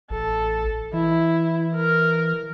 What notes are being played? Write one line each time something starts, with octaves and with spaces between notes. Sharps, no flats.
A1 A4
E3 E4
A#4